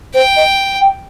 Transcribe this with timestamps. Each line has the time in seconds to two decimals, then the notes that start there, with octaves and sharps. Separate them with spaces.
0.14 C5 G5
0.36 D#5
0.81 G5